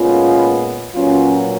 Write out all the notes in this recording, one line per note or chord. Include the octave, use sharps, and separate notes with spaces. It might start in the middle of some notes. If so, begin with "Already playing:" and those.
Already playing: A#2 G#3 B3 C#4 F4
A#2 F#3 B3 C#4 F4